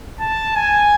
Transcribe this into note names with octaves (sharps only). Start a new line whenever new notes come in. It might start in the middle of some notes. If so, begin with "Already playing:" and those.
A5
G#5